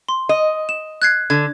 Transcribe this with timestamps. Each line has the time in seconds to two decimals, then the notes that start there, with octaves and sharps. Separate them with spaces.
0.09 C6
0.29 D#5
0.69 E7
1.02 F#6 G#6 C7
1.30 D3 G#6